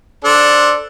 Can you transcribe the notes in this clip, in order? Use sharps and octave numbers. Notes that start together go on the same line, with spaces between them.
D4 A4 C5